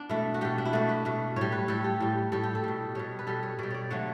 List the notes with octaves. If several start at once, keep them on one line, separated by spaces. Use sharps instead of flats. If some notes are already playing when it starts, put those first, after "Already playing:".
Already playing: B3 D4
B2 A3 E4
F#4
B2 A3 G4
D4
E4
B2 A3 F#4
B4
B2 A3
A2 G3 C#5
B4
A2 G3 A4
G4
A2 G3
A2 G3 A4
G4
A4
B2 G3
B2 G3 C#5
B4
B2 G3 A4
C#5
B2 G3 D5
C#5 D5
D3 F#3 A3 C#5